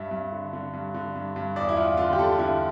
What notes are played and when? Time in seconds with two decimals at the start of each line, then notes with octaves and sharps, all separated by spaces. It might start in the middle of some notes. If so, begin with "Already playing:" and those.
Already playing: G2 E5
0.11 G2
0.32 D3
0.53 D3
0.73 G2
0.94 D3
1.15 G2
1.36 G2
1.56 E2 D5
1.69 E4
1.77 E2 F4
1.97 D3 F4
2.13 G4
2.19 D3 A4
2.35 F4
2.39 D3 E4